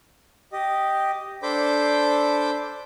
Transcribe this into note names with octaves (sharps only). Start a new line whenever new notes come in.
G4 D#5
D4 A4 C5 B5 D6 G6